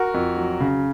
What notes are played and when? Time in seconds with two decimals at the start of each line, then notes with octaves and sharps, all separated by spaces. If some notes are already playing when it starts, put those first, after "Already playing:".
Already playing: F#4 A#4
0.14 F2
0.37 F#3
0.60 C#3